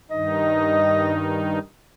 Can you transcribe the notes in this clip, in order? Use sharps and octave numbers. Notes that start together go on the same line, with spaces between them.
G2 D#3 D#4 D#5